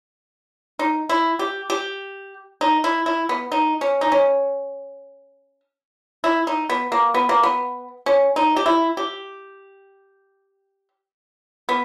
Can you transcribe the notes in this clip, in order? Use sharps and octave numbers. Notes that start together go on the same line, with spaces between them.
D#4
E4
G4
G4
D#4
E4
E4
B3
D#4
C#4
D#4
C#4
E4
D#4
B3
A#3
B3
A#3
B3
C#4
D#4
G4
E4
G4
B3